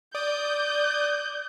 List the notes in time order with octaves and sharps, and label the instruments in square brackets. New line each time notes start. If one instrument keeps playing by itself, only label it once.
[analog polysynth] D5 D#6 [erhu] G6